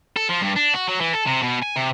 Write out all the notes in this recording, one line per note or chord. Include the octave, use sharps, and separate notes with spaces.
A4
F3
G2
D4
F#4
F#3
E3
A4
C3
B2
G#5
C3